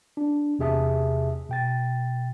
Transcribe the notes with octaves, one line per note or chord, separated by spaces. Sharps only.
D4
E2 C3 G#4 E5 A5 D#6
B2 G5 A6